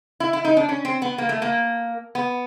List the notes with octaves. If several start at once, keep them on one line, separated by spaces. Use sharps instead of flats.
E4
E4
D#4
D4
C#4
C4
B3
A#3
A3
A#3
B3